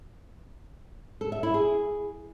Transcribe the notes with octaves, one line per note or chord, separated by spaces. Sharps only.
A4
E5
E4
G#4